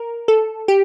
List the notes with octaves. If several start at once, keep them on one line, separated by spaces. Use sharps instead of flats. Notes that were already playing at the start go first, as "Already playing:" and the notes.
Already playing: A#4
A4
G4